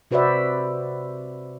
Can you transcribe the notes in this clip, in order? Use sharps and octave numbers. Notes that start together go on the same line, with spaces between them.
C3 F#4 B4 C5 D5 E5